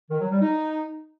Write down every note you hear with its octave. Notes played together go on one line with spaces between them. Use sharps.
D#3
F#3
G3
D#4